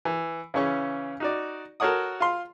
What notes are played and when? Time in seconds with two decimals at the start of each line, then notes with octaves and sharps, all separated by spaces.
0.05 E3
0.54 C#3 E3 C#4 C#6
1.20 D#4 F#4 D5
1.80 F#4 A4 A#4 C#5 F#5 D#6
2.20 F4 C6